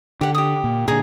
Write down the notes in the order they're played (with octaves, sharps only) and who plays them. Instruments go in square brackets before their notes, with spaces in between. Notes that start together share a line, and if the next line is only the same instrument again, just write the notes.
[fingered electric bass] D3 [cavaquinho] G4 F#5
[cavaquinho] G4 D#6
[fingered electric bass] A#2
[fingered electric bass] A#2 D3 [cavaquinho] G#4 A#5